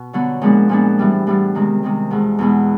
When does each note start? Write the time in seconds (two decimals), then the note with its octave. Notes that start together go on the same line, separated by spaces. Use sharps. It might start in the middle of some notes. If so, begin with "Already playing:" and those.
Already playing: B2
0.13 D3 F#3 B3
0.42 A#2 F3 G#3 B3 D4
0.69 A#2 F3 G#3 B3 D4
0.98 A2 E3 G3 B3
1.27 A2 E3 G3 B3
1.55 C3 D#3 G#3 C4
1.83 C3 D#3 G#3 C4
2.11 E2 B2 G#3
2.39 E2 B2 G#3